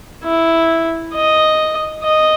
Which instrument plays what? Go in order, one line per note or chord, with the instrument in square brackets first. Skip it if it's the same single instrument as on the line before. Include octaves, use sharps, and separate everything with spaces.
[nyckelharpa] E4
D#5
D#5